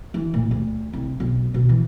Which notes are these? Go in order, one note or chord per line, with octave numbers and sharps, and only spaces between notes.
E3
A#2
D2
C2
B1
B2
E3